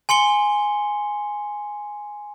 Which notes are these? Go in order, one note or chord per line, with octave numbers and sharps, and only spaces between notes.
G#5 C6 C#7 G7